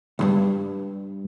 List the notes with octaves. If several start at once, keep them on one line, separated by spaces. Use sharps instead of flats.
C2 G2